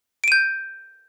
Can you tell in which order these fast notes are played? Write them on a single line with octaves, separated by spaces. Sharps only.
D7 D#7 G6